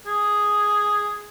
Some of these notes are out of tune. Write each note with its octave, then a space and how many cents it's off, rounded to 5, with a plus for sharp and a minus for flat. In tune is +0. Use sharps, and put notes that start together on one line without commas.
G#4 +0